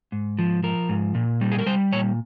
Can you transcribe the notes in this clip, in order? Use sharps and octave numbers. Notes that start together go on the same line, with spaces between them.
G#2
F3
F3 A#4
G#2
A#2
G3
G#4
A#4
G3 C5
A#2 C#5